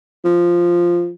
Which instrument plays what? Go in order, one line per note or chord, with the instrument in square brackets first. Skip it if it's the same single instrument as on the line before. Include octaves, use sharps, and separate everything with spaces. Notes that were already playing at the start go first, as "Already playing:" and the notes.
[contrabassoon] F3